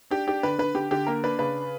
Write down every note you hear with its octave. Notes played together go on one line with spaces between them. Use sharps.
D4 G4
D4 G4
D3 B4
D3 B4
D3 G4
D3 G4
A#3 A#4
D4 B4
C#3 B4